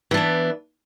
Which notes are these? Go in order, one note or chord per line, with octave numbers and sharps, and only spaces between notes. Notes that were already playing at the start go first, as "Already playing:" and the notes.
E3 B3 D4